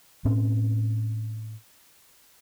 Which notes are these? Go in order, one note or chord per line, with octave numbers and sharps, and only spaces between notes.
A2 C4 C#4